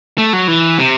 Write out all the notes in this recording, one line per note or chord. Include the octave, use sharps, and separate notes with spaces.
A3
F#3
E3
C3